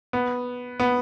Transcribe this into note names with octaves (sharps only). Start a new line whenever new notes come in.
B3
B3